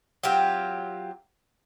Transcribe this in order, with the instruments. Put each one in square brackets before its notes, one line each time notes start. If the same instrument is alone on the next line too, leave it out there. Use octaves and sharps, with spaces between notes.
[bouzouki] F#3 C4 F4 G4